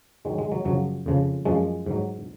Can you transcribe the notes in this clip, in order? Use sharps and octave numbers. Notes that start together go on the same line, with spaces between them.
G#2 D#3 F#3 G#3
G#3
F#3
F#2 C#3 F3 F#3
F2 C#3 F3
F#2 F3 G#3
G#2 F#3